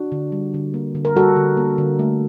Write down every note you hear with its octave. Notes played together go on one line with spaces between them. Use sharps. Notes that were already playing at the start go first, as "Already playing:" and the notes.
Already playing: D4 F#4
D3
G3
D3
A#3
D3
A#4
G3 F#4 A4
D3
A#3
D3
A3